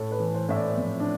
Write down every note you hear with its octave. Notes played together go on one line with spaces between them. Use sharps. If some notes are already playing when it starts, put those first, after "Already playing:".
Already playing: A2 A4
B4
E3
C5
A2 E5
D5
F2
D4